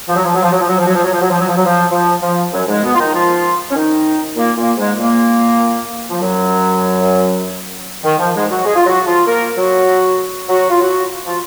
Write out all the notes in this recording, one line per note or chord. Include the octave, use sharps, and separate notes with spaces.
F3
F#3
F3
F#3
F3
F#3
F3
F#3
F3
F#3
F3
F#3
F3
F#3
F3
F#3
F3
F#3
F3
F3
F3
F#2 F#3
G#2 G#3
B2 B3
F4
D#3 D#4
F3 F4
C#4
D#3 D#4
A#2 A#3
A#2 A#3
G#2 G#3
A#2 A#3
F3
F#2 F#3
D#3
F3
G#2 G#3
F#3 F#4
G#3 G#4
F4
F#3 F#4
F3 F4
A#3 A#4
F#3 F#4
F#3 F#4
F4
F#3 F#4
F3 F4